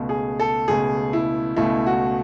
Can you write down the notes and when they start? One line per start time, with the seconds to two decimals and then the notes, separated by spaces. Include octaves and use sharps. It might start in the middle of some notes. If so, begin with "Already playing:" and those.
Already playing: C#2 B2 A3
0.09 G#4
0.40 A4
0.68 C#2 B2 A3 G#4
1.13 E4
1.56 C#2 B2 A3 E4
1.87 F#4